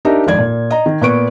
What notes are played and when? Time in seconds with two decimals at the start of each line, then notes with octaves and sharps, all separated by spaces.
0.05 D4 D#4 G4 A#4 D#5 E5
0.27 G#1 F2 D5 G#6
0.38 A#2
0.71 D#5 A#5
0.86 D#3
1.01 A#2 B3 B4 C#6 D7